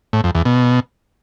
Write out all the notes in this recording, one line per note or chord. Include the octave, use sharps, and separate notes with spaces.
A2
F2
E2
B2